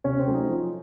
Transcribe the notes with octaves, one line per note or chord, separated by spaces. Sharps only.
C3 C#4 C#5
C4 C5
F#3 A3 C#4
D#4 D#5
F3